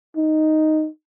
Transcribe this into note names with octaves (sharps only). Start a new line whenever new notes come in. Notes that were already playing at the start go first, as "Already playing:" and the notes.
D#4